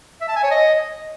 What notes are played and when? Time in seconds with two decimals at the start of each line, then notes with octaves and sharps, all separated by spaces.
0.21 E5
0.29 A5
0.36 G#5
0.44 C#5
0.51 D#5